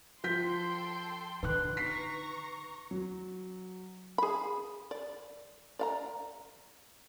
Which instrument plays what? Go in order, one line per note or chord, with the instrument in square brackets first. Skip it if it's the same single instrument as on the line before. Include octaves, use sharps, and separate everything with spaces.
[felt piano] F3 G6 B6 [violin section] A4 G5 C6
[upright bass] D3 D#4 [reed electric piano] B4 F#6
[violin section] A#5 C#6 [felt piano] B6 C7
[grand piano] F#3
[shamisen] G#4 B5
D5
D5 F5 A#5